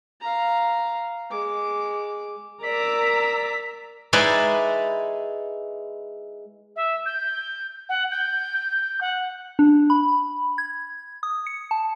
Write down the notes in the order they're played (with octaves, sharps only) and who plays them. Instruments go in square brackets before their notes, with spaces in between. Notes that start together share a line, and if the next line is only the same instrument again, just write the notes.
[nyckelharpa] F5 A#5
G#3 D6
[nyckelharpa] A#4 D5 [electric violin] A#5 E6 [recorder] B6
[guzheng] G#3 D#4 E4 B4 D5
[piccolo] E5
G6
F#5
G6
F#5
[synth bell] D4
B5
G#6
D#6
C#7
A5